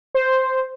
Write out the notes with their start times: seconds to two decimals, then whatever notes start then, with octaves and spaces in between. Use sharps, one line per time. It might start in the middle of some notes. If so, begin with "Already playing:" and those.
0.15 C5